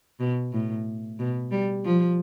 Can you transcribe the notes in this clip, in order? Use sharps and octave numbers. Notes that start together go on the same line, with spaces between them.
B2
A2
B2
G3
F3